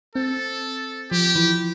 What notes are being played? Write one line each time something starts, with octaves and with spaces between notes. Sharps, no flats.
C4 A4
F3 G4
E3